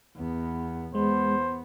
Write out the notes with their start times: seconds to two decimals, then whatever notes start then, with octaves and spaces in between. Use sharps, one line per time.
0.16 E2 B3
0.95 E2 G#3 B3 C5